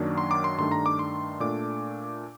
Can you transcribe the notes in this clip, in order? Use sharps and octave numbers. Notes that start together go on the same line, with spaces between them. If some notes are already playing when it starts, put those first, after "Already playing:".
Already playing: F#2 D#3 F#3 A#3 D4
C6
D6
C6
G2 D#3 A3 D4 C6
A#5
D6
C6
A#2 A3 D4 D6